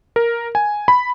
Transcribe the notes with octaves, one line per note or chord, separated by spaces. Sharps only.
A#4
G#5
B5